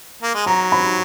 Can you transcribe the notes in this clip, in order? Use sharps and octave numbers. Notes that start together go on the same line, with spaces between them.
A#3
G#3
F#3 A#5
B5